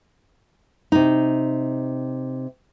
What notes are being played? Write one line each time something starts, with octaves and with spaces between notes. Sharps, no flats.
C3 D#4